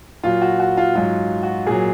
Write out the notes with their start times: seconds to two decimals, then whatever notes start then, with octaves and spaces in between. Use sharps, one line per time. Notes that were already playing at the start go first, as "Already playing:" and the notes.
0.23 A#2 F#3 F4
0.42 F#4
0.60 F#4
0.77 F4
0.95 G#2 F#3 F4
1.43 F#4
1.66 A#2 F#3 G#4